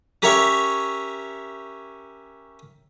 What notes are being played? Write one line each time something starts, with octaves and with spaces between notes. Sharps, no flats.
C#4 G4 A#4 C#5 E5 C#6